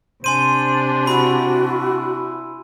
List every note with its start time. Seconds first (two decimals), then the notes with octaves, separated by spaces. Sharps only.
0.24 C3 D4 C5 G#5 C6 D#7
1.07 E4 F#4 B5